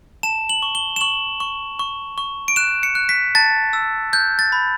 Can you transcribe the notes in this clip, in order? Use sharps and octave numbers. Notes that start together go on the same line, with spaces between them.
A5 E7
F#7
C#6
G7
E7
C#6 F#7
C#6
C#6
C#6
D7
F#6 E7
C#7
F#6
B6
A5 A6
E6
F#6 G6
A6
B5